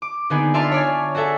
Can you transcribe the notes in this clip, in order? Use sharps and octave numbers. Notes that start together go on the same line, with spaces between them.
D6
D3 A#3 B3 D4 D#4 G#4
F4 D5 E5 A5 C6 F6
C#5 D5 G#5
F#4 G#4 A4 E5